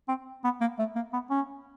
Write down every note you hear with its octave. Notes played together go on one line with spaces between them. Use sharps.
C4
B3
A#3
A3
A#3
B3
C#4